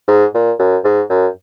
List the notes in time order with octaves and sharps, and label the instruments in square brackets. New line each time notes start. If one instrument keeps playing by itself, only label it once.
[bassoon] G#2
A#2
F#2
G#2
F#2